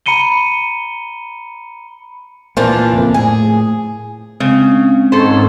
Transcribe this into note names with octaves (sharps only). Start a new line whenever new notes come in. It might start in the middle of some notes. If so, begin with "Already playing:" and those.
A#5 B5 C#7 D#7 G7
A#2 E3 F3 A#3 D4
F#1 F2 A#3
A2 G#4
C#3 G#3 C4 C#4
G#2 D#3 A4 C5 C#5